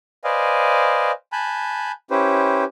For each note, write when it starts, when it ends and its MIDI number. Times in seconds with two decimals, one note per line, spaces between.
0.24 1.12 71
0.24 1.12 72
0.24 1.12 74
0.24 1.12 75
0.24 1.12 77
0.24 1.12 80
1.32 1.92 80
1.32 1.92 81
1.32 1.92 83
1.32 1.92 90
1.32 1.92 91
2.11 2.64 61
2.11 2.64 64
2.11 2.64 67
2.11 2.64 71
2.11 2.64 72